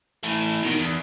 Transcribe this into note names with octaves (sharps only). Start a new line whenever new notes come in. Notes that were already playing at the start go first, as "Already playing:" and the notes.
E3 A3
B2 D#3
E2